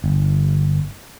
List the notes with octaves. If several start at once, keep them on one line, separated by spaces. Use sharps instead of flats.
G1